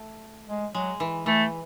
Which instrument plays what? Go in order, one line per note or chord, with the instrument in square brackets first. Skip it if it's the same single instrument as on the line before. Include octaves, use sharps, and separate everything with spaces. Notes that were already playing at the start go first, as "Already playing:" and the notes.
Already playing: [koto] A3
[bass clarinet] G#3
[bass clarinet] F#3 [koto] G#3
[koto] E3
[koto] E3 [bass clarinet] A3